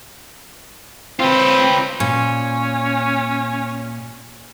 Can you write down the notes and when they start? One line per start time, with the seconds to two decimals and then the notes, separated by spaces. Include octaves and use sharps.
1.20 C4 F4 B4
2.00 A#2 C#4